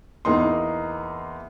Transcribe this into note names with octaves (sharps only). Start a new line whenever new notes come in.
E2 A#3 D#4 C6